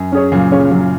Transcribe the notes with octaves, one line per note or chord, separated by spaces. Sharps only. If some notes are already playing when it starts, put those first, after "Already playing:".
Already playing: F#2
C#4 G#4 C#5
A#2 C#3 F#3
C#4 G#4 C#5
F#3